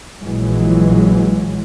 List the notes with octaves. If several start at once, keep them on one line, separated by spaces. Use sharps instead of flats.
A#1 A#2 E3 F#3 G#3